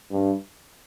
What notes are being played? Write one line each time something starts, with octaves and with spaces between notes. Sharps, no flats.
G2